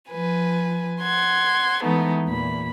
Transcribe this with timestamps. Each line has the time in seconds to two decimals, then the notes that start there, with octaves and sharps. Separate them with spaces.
0.10 F3 B4 G#5
1.01 F#5 C6 G#6
1.82 E3 G#3 A3 B3 D#4
2.25 E2 A#2 B5